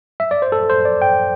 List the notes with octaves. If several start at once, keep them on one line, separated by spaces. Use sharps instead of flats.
E5
D5
C5
A4
C5
D5
G5